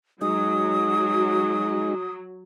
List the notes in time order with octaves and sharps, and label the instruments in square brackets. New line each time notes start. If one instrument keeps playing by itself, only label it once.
[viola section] F#3 [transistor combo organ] G#3 D#4 [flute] D#6